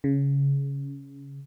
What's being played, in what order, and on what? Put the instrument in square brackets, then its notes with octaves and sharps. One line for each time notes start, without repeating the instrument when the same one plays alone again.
[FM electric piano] C#3